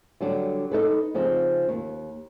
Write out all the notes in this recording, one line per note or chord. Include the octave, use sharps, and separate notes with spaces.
D3 F#3 G3 D4
D#4 A4 B4
C#3 F3 C4 D#4
D#2